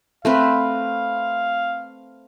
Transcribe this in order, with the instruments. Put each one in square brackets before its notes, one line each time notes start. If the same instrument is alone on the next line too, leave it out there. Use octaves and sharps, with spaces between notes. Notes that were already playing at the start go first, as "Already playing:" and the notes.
[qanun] A3 C4 B4 [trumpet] F5